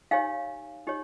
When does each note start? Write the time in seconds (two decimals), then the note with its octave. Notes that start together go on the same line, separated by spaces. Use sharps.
0.11 D#4 G4 C#5 F5 G#5
0.87 D#4 G4 C#5